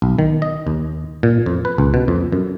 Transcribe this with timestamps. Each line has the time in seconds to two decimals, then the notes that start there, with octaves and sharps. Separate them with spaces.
0.02 B1
0.19 D#3
0.42 D#5
0.67 D#2
1.23 A#2
1.46 F2
1.65 B4
1.78 C#2
1.94 B2
2.08 F2
2.32 F#2